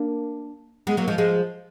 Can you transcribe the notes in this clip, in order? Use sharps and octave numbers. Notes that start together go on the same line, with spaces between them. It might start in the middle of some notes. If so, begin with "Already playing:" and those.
Already playing: A#3 D4
G#3 B3
F#3 A#3
F3 G#3
F3 G#3